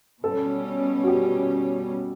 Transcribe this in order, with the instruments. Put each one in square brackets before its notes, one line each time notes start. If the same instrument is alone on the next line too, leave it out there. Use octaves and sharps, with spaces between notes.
[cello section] B2 G3 C#4 [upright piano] A4
[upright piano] F#4
G4